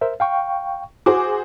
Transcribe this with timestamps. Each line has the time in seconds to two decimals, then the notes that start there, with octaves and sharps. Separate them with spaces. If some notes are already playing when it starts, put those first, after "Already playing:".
0.01 A#4 C5 E5
0.20 F5 G5 C#6
1.06 F#4 G#4 C5 D6